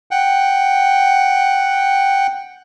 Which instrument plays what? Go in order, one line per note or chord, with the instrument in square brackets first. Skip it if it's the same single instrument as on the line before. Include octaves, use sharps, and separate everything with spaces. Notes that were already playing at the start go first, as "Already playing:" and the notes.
[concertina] F#5 G5